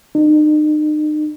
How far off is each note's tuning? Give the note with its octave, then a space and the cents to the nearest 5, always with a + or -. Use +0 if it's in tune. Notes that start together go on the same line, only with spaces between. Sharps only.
D#4 -40